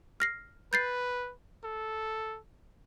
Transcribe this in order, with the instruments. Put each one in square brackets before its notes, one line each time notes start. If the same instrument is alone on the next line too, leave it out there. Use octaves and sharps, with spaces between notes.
[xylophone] F6 A#6 C7
[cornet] B4 [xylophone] G6 A6 C7
[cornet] A4